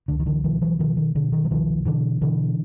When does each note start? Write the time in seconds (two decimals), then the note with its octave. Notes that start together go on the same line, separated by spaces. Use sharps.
0.08 C#2 D3
0.19 D#3
0.26 D3 E3
0.44 B2 D#3 F3
0.62 E3 F#3
0.79 B2 D#3 F3
0.97 D#3
1.15 B2 D3
1.32 D#3
1.45 F#3
1.50 C2 D#3 F3
1.86 B2 D3 E3
2.21 B2 D3 E3